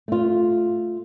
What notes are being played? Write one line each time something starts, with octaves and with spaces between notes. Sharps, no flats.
A3 F4